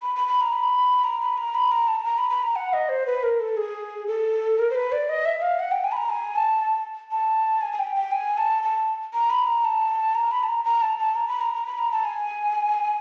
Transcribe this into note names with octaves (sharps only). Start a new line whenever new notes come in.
B5
B5
B5
A#5
B5
A#5
B5
A#5
B5
A#5
A5
A#5
B5
B5
A#5
F#5
D#5
C5
B4
A#4
A4
G#4
A4
A#4
C5
B4
D5
D#5
E5
F5
F#5
G5
G#5
B5
A#5
G#5
A5
A5
G#5
G#5
G5
G5
G#5
A5
A5
A#5
B5
A#5
A5
A#5
B5
A5
A#5
A#5
A5
A5
A#5
B5
A#5
A#5
B5
A#5
A5
G#5